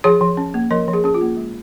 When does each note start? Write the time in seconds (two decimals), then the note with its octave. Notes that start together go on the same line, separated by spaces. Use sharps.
0.04 F3 G#4 C#5
0.21 F3
0.37 C#4
0.54 A#3
0.71 F3 A#4 D#5
0.88 F3
0.93 G#4
1.04 C#4 G#4
1.14 F4
1.21 A#3
1.37 G#3